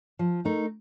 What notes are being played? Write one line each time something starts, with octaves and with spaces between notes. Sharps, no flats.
F3
A3 D#4 A#4